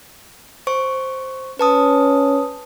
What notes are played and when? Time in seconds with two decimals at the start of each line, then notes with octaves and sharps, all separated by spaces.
0.67 C5 C#6
1.59 C#4 B4 A5 D#6